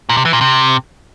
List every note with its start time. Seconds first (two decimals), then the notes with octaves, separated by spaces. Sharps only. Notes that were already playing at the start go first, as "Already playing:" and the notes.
0.09 A#2
0.17 C3
0.25 E3
0.33 A#2
0.41 C3